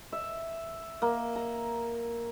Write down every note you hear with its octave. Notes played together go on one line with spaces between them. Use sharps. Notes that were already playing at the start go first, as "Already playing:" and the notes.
E5
A#3
A#5